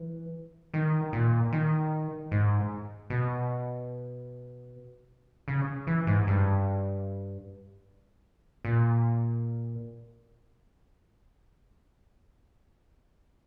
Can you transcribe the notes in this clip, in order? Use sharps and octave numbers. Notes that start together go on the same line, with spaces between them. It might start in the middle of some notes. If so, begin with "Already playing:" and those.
Already playing: E3
D#3
A#2
D#3
G#2
B2
C#3
E3
G#2
G2
A#2